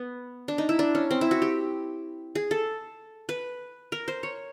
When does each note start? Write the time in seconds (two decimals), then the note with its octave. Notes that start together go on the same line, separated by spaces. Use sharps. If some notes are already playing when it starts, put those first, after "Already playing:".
Already playing: B3
0.48 D4
0.58 D#4
0.69 E4
0.79 D4
0.95 C#4
1.11 C4
1.21 E4
1.31 F#4
1.42 G4
2.35 G#4
2.51 A4
3.29 B4
3.92 A#4
4.08 C5
4.23 C#5